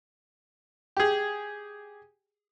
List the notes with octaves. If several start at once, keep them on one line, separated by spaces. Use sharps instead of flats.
G4 G#4